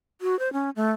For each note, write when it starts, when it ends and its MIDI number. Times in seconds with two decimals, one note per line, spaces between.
0.21 0.38 66
0.39 0.52 72
0.53 0.70 61
0.76 0.91 57